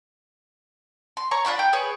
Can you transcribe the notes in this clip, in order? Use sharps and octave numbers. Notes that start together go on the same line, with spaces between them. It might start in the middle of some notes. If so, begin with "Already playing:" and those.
C6
C#5 A#5 C#6
D4 F4 F#5 B5
G5
G#4 B4 C#5